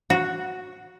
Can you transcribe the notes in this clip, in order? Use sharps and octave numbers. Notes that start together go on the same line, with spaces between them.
F#4